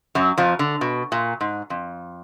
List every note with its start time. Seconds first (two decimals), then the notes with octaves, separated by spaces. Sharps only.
0.15 F#2 F#3
0.38 F2 F3
0.59 D3
0.81 B2
1.12 A#2
1.41 G#2
1.70 F2